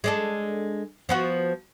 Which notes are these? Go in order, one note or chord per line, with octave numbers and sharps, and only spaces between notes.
G#3 D4 A4
F3 B3 F#4